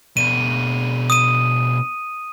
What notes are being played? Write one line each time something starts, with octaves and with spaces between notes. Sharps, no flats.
B2 D4 D#7
D#6 D#7